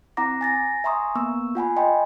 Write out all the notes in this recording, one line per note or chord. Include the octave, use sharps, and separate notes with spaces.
C4 E4 F#5 A#5 D6 A#6
G#5 A6 A#6
E5 G#5 A#5 C6 C#6 D#6
A#3 B3 C#6 E6
F4 F#5 G#5 B5
D#5 G5 G#5 B5 C6